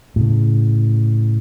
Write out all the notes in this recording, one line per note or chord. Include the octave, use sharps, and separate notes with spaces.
A2 C#3